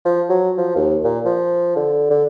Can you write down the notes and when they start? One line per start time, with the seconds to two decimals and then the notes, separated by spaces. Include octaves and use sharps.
0.05 F3
0.29 F#3
0.58 F3
0.76 D#2
1.04 A#2
1.25 F3
1.76 D3
2.10 D3